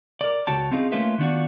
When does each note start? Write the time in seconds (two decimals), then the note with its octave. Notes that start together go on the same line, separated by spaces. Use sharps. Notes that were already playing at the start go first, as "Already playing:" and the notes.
0.21 A#4 D5
0.47 C#2 F#4 C#5 G5 A5
0.72 C4 C#4 D#4 F4 G#4
0.92 A3 A#3 C#4 F4 B4 E5
1.19 D#3 B3 D4 F4 F#4